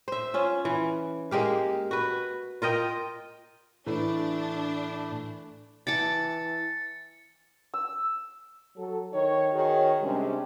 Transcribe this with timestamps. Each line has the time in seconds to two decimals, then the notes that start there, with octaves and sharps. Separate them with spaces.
0.08 C5 E5
0.34 C#4 F4
0.65 E3
1.31 G#3 A#3 G4 F5
1.91 F#4 B4
2.62 F4 A#4 D#5 G5
3.86 A2 E3 A3 D4
5.87 E3 A5 D6 A6 C#7
7.74 E6
8.76 F#3 A4
9.12 D#3 D#4 C#5
9.53 D#3 F#4 G#4 C#5
10.02 C3 G3 G#3 C#4 D4